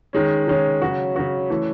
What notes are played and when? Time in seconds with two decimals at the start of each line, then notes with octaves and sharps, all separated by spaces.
0.13 D#3 G#3 C#4
0.48 D#3 G#3 C#4
0.82 C#3 F#3 C#4 F#4
1.16 C#3 F#3 C#4 F#4
1.50 E3 A3 C#4